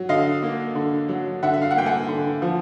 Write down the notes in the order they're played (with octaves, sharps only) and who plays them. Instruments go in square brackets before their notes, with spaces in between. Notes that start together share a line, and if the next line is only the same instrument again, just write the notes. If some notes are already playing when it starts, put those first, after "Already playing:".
Already playing: [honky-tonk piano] F#3
D3 D#5 F5
A#3
D3
F#3
D3 E5 F#5
E5
F5
F#5
A#3 G5
F#5 G#5
D3
F3